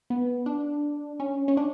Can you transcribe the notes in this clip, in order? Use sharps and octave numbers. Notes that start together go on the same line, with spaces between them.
B3
D4
C#4
C#4
D4